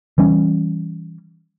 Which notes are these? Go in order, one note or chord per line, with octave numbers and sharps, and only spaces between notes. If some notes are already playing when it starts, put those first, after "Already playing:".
E3 G3 C#4